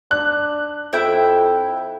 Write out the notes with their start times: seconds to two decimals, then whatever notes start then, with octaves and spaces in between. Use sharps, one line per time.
0.11 D4 F#6
0.93 F2 E4 E5 G5